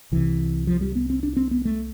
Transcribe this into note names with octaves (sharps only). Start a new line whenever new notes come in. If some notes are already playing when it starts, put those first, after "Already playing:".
C2 C3 E3
F3
G3
B3
C4
D4
C4
B3
A3